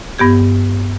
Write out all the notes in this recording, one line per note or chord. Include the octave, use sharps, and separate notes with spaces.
G2 B3 G4 G#6